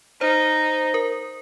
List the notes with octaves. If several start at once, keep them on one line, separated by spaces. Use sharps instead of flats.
D#4 C5
A#4